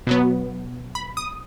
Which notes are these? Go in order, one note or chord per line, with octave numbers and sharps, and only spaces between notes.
B2 F#3 B3
B5
D#6